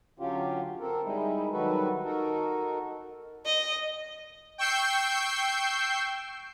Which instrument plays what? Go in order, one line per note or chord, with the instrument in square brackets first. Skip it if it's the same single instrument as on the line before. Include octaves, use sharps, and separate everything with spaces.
[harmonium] D3 F#3 C#4 F4 G4
C4 A4 A#4
G3 G#3 D#4 E4
D#3 F#3 G3 F#4 A4 B4
D#4 F#4 A4 A#4
[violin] D#5
[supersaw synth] G5 C#6 E6 G6 C7